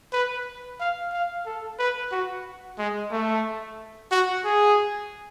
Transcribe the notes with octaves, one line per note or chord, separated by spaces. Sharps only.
B4
F5
F5
A4
B4
F#4
G#3
A3
F#4
G#4